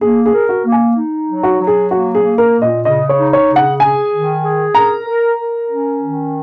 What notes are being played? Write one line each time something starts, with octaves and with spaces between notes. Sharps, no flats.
A#3 G#4
G#4
A#4
F#4
A#3
G#5
D#4
F#3
F#4
F#3
G#4
A#3 F#4
G#4
A#3
A#4
A#2
D#5
C#3 D#5
C#5
D#4
C#5
C#3
F#5
G#4 G#5
D#3
G#4
A#4 A#5
A#4
A#4
C#4
D#3